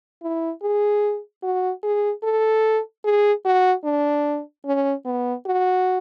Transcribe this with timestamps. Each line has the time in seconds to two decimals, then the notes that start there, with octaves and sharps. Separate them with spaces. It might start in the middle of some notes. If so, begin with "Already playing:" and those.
0.23 E4
0.63 G#4
1.43 F#4
1.83 G#4
2.23 A4
3.04 G#4
3.45 F#4
3.84 D4
4.65 C#4
5.06 B3
5.46 F#4